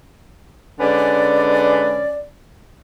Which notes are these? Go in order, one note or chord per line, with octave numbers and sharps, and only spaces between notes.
D3 G#3 C#4 B4 D5